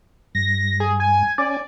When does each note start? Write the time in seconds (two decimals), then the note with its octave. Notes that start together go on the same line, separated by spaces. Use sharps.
0.35 G2 A#6
0.80 G#4
1.00 G#5
1.38 C#4 D5 G#5